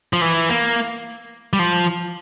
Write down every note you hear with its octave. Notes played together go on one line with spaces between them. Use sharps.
F3
E3
A#3
G3
F3